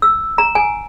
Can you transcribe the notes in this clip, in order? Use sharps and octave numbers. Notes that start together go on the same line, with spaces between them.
E6
A#5
G#5